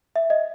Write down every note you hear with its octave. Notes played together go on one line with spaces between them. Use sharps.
E5
D#5